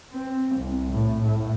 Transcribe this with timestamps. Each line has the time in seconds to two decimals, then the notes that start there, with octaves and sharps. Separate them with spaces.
0.12 C4
0.56 C2
0.92 A2
1.22 A2